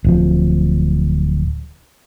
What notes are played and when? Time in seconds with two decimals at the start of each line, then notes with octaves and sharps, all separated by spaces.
0.04 D1 F3